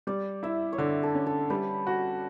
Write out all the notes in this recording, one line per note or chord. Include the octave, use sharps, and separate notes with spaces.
G3 D5
E4 E5
C#5
D3 D5
A4
C#4
A4
G3 B4
F#4